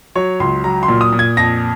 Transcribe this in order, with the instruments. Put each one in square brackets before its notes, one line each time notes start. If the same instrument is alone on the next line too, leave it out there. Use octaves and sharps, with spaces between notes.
[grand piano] F#3 C#5
C#2 C6
F#3 A#5
C6
A#2
D#6
A#2
G#6
F2 A#6